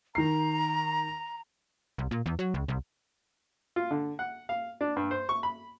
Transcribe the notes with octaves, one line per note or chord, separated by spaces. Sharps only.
D#3 A#5 C7
C2
A#2
E2
F#3
C#2
C2
F4
D3
F#5
F5
D4
G2
C5
C#6
B5